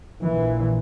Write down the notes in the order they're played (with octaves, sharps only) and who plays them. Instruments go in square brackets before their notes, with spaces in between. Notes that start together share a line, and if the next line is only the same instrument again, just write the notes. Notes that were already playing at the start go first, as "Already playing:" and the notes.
[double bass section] A#1 A#2 E3